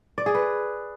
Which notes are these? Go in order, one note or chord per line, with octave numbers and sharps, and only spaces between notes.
D5
G#4
B4